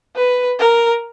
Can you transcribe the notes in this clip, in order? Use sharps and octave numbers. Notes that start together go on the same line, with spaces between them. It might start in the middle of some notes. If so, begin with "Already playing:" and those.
B4
A#4